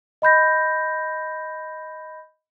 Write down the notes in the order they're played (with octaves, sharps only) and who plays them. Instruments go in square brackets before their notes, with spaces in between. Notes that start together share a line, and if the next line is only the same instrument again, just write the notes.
[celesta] D#5 B5 G6 A#6